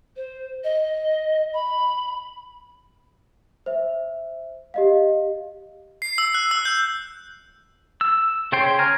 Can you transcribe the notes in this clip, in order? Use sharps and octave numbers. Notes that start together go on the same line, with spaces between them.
C5
D#5
B5
C5 E5
G4 D#5 F5
C7
E6
F#6
E6
G6
E6
C#3 C5 C#5 G5 C6
G#5 A#5 F6